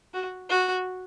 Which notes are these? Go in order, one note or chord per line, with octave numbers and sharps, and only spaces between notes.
F#4
F#4